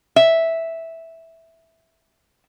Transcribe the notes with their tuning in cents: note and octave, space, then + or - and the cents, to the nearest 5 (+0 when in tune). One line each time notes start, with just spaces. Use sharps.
E5 -5